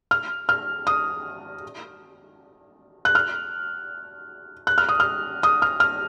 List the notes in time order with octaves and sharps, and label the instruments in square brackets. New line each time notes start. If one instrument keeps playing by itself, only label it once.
[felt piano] F6
F6
D#6
F#6
F6
F#6
F6
D#6
F6
D#6
F6
F6